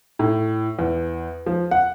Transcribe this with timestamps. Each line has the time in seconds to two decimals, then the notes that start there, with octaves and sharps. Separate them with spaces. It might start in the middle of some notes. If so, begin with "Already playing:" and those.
0.19 A2
0.79 E2
1.46 F3
1.71 F#5